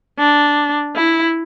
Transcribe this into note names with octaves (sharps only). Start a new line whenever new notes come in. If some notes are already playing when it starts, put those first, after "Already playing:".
D4
E4